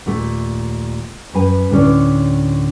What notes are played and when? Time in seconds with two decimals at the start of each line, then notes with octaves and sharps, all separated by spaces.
0.06 D#2 A#2 A3
1.34 F#2 B4 G#5
1.70 D2 A2 D3 C#4 D5